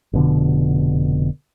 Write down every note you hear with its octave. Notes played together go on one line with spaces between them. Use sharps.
F1 B2 D3